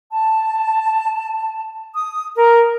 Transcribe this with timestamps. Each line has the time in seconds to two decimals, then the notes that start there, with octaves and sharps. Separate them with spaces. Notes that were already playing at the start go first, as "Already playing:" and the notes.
0.12 A5
1.95 D#6
2.36 A#4